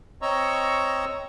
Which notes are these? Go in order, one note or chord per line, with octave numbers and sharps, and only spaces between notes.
C4 C#5 D#5 A#5 C#6 E6